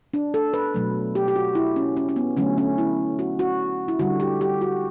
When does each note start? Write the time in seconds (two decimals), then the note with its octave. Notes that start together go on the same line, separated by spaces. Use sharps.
0.14 D4
0.34 A4
0.54 B4
0.74 B2 F#3 A3
1.15 G4
1.28 G4
1.36 F#4
1.55 E4
1.76 C#4
1.97 C#4
2.09 C#4
2.16 B3
2.37 D3 F#3 A3 C#4
2.58 C#4
2.78 E4
3.19 F#4
3.39 F#4
3.88 E4
3.99 D3 G3 F#4
4.20 G4
4.41 G4
4.61 F#4